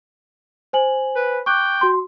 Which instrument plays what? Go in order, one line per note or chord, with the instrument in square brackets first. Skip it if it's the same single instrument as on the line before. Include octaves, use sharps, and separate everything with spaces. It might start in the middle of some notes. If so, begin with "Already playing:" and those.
[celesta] C5 G#5 F#7
[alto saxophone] B4
[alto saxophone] G5 [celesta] C#6 D6 F#6
[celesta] F#4 C6